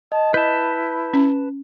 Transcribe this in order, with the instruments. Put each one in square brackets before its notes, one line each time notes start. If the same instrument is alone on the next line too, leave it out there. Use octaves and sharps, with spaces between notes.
[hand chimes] D#5 [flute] A5
[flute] E4 [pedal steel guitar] B4 A5 [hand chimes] G6
[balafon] C#4